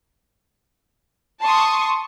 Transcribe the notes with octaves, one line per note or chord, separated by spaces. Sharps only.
A5 C6 C#6 D#6